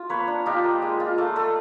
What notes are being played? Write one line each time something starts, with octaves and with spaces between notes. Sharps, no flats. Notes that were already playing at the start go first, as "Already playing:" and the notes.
Already playing: F4
A#3 B4 C#5
D4
D#4 F4 G4
A#3
G#3
F4
A3
A3